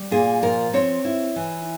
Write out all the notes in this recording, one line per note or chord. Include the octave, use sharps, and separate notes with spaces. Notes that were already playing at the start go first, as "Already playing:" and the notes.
Already playing: G3
A#2 G#4
F3 A#4
C4 C#5
E4
E3